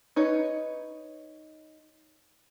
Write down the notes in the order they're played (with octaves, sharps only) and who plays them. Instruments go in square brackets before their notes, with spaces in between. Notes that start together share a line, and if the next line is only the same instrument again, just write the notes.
[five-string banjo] D#4 B4 C#5